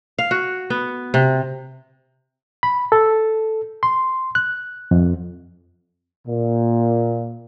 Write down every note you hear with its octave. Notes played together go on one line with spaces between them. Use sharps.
F5
F#4
B3
C3
B5
A4
C6
F#6
F2
A#2